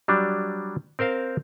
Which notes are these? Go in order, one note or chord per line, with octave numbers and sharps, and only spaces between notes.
F#3 G3 D4
C4 A#4 C5 F5